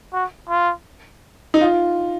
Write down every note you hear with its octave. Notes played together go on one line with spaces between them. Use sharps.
F#4
F4
D#4
F4